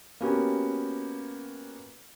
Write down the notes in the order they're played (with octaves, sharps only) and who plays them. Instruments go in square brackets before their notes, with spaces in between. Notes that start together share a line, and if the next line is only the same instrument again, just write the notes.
[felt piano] A#3 B3 C#4 F#4 G4